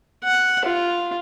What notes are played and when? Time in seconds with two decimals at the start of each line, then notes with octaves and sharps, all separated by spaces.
0.24 F#5
0.65 F4